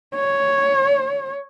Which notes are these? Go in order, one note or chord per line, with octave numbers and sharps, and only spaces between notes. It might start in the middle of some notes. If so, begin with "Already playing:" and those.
C#5